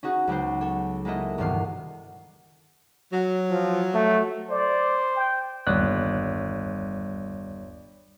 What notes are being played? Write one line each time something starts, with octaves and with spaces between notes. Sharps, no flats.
C#4 D#4 F#4 G#4
C#2 F#3 B3 C5
A4 C#5
G#3 A#3 B3 E4 A4 D#5
E1 G2 C3 D#3 B3 F5
F#3
F3
A3
C5 D5
G5
G1 D#2 G3 C#5 D5 F#6